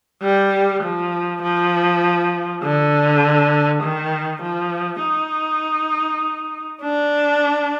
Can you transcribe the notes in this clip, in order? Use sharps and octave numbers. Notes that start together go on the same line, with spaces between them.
G3
F3
F3
D3
D#3
F3
D#4
D4